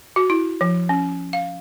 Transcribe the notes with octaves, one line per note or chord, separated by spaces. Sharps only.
F#4
E4
F3
C#4
F5